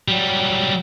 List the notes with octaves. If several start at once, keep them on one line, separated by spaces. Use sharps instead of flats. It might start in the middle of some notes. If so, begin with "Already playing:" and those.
F#3 G3